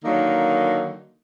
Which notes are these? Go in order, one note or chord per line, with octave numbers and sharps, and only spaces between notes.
D3 D#3 F#3 A#3 D#4